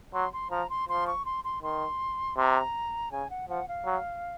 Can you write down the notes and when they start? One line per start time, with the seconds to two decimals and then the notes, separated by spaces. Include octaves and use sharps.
0.13 F#3 C6
0.33 C6
0.51 F3 A#5
0.70 C6
0.89 F3 C6
1.07 C#6
1.25 C6
1.44 C6
1.62 D#3 C6
2.37 C3 A#5 C6
3.11 C#3 G#5
3.30 F#5
3.49 F3 F#5
3.68 F5
3.85 F#3